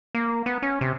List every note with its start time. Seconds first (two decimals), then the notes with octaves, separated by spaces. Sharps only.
0.15 A#3
0.46 B3
0.62 C#4
0.81 C3